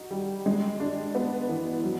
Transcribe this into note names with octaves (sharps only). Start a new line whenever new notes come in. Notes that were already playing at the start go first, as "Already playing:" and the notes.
Already playing: D#4 F#4
G3
G#3
D4
B3
E3
F#3